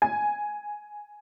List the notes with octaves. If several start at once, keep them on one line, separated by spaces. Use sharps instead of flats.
G#5